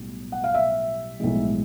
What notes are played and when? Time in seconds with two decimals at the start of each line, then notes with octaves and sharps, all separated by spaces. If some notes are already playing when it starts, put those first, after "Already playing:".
Already playing: B1 A2 G3
0.32 F#5
0.44 F5
0.54 E5
1.20 B1 A2 F3 G#3